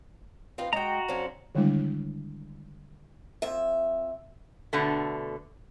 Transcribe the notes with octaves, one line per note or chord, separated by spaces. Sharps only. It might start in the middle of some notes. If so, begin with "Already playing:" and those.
C4 D#4 F4 B4 F5
G#3 D4 F#4 G5 A#5
F2 C#4 D4 C5
D3 D#3 G3 G#3 D4 E4
F2 E5
B2 D3 A3